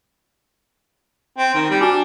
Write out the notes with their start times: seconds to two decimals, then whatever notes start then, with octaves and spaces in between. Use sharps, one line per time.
1.38 C4
1.54 D#3
1.70 G3
1.81 D4 F#4 G#5 D6